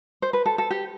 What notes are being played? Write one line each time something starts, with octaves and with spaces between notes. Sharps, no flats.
C5
B4
A4
A4
G4